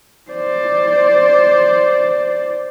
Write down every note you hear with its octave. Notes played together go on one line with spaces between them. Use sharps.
C5 D5